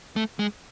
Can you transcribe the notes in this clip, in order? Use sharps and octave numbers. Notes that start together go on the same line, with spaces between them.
A3
G#3